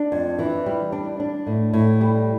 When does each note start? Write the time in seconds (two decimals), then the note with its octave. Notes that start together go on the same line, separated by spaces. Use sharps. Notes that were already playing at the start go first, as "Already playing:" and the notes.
Already playing: D4
0.12 F2
0.39 E3
0.66 G3
0.92 D4
1.20 D4
1.47 A2
1.73 A2
2.01 G3